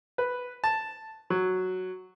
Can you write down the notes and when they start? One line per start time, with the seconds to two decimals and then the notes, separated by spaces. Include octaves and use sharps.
0.18 B4
0.64 A5
1.30 F#3